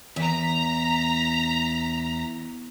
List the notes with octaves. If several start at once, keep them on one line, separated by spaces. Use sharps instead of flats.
E2 A#5 B6